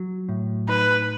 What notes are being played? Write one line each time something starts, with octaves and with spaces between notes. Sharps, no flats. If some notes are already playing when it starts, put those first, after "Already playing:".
Already playing: F#3
A2
D#4 B4